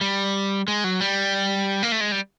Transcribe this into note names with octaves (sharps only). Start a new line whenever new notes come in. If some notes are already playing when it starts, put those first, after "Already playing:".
G3
G#3
F#3
G3
A#3
A3
G#3
G3